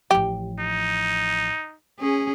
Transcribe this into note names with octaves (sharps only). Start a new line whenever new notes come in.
A1 F3 G4
D#4
C#4 G#4